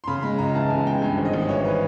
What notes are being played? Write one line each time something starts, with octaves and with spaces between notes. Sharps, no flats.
C6
C#3 B5
G#3 B5
C#2 A#5
E3 A5
C#3 G#5
G#3 G5
G2 G#5
G#1
D#5
G#1
E3 C#5
B4